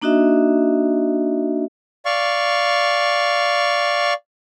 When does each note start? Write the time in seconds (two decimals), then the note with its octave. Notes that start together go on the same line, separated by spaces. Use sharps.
0.02 A#3 D4 D#4 F#4 D#5 E5
2.05 D5 F5 C#6